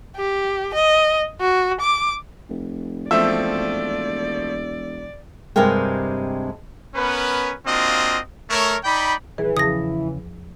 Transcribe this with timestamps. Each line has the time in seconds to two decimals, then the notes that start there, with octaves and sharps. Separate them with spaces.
0.16 G4
0.74 D#5
1.40 F#4
1.80 D6
2.49 F1
3.11 E1 F3 A3 C4 D5 E5
5.56 G2 C3 G#3 A#4 G5
6.95 B3 C#4 A#4 B4
7.66 A#3 C4 D4 F4 F#4 D#5
8.50 A3 A#4 C#5
8.84 D#4 D5 G5 B5
9.38 D#1 E3 G#4 B4
9.57 E2 C#3 F3 A5 D#6 A#6